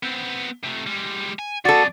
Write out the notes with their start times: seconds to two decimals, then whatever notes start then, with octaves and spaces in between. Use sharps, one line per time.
0.03 B3 C4
0.63 C3 A3
0.86 G3 G#3
1.39 G#5
1.65 F2 F#4 G#4 A4 D5